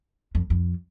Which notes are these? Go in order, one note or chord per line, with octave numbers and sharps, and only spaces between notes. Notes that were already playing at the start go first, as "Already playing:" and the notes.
F2
F2